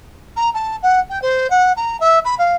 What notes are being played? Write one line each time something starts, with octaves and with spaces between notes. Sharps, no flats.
A#5
A5
F#5
G5
C5
F#5
A#5
E5
B5
F5